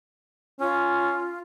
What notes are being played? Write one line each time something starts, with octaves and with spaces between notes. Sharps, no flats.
C#4 F4